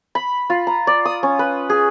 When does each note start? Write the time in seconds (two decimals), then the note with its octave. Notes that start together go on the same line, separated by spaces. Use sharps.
0.15 B5
0.50 F4
0.67 A#5
0.87 D5
1.05 D#6
1.23 C#4
1.39 B4
1.70 G#4